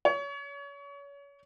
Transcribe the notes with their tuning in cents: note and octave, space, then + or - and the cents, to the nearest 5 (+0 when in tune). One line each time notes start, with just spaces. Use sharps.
C#5 +30